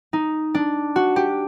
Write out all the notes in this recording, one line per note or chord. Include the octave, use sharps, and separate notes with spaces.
D#4
D4
F#4
G4